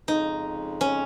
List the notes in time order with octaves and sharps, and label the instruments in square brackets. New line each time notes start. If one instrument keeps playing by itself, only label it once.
[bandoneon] F2 C#3 G#3 [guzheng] D#4
[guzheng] C#4